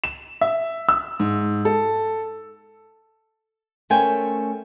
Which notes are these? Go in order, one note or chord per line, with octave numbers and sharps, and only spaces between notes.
E7
E5
E6
G#2
A4
A3 C#4 A#4 C5 G5 G#5